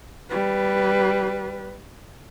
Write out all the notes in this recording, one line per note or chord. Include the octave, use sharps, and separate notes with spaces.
G3 B4